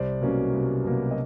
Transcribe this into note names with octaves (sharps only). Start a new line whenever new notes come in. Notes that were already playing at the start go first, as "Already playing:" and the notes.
Already playing: C2 C5 D5
B2 F#3 A#3 C#4
C2
B2 F#3 A#3 C#4
D#5